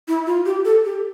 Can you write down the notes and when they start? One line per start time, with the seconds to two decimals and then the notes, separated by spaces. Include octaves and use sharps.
0.08 E4
0.26 F4
0.46 G4
0.65 A4
0.85 G4